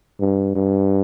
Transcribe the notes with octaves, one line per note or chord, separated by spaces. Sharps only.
G2
G2